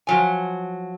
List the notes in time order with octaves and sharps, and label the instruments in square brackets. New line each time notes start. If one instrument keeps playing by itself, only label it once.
[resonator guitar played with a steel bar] F3 F#3 G#5